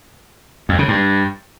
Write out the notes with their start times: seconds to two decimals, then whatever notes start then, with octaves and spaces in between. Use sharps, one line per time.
0.69 F2
0.79 C#3
0.88 G2